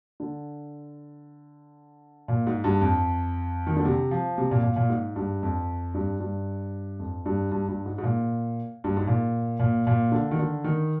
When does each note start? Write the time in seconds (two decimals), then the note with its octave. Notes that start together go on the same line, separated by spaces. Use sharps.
0.20 D3
2.28 A#2
2.47 G#2
2.64 G2
2.81 F2
3.67 D#3
3.76 D3
3.85 C3
4.11 F3
4.38 C3
4.51 A#2
4.63 A#2
4.76 A#2
4.89 G#2
5.16 G2
5.43 F2
5.94 G2
6.20 G2
6.99 F2
7.26 G2
7.52 G2
7.68 G2
7.86 G#2
7.98 G#2
8.04 A#2
8.84 G2
8.97 G#2
9.07 A#2
9.59 A#2
9.87 A#2
10.12 D3
10.31 D#3
10.39 D3
10.64 D#3